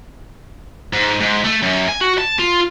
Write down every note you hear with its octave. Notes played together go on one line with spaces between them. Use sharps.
G#2
G#2
A3
F#2
G#5
F#4
A5
F4